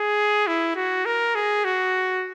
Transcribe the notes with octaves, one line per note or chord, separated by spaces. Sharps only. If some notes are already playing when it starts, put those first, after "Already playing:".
Already playing: G#4
E4
F#4
A#4
G#4
F#4